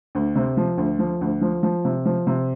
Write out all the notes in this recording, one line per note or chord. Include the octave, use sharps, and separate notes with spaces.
D2
C3
F3
D2
F3
D2
F3
F3
C3
F3
C3